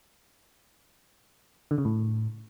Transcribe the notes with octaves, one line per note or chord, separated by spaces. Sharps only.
D3
C#3
A2